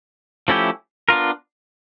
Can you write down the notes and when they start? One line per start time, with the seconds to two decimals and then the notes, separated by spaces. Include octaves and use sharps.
0.48 F3 A3 C#4 E4 G4
1.09 B3 D4 F4 A#4